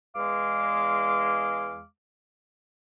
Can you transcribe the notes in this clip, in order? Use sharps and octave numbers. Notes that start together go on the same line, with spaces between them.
E2 G#3 F5 D6